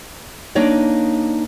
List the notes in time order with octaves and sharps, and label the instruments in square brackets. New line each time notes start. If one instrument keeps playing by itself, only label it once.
[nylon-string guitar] A#3 D4 D#4 C#5 D5